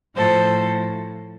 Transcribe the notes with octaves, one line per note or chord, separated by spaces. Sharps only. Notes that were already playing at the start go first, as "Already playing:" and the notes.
A2 F3 A4 C5